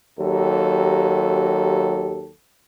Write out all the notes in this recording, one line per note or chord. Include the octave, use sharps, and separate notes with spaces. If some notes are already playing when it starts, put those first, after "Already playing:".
D#2 F#3 G4 A4